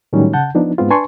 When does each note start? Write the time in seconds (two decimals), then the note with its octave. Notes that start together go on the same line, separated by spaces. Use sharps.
0.13 A2 D#3 F#3 G3 C#4 D#4
0.33 C#3 F#5 A5 G6
0.55 F3 B3 D4 D#4
0.78 G#2 G#3 B3 C4 F4
0.90 D4 B4 G#5 A5 C6 C#6